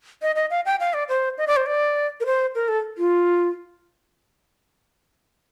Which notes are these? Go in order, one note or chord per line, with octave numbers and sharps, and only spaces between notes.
D#5
D#5
F5
G5
F5
D5
C5
D#5
D5
C5
D5
A#4
C5
A#4
A4
F4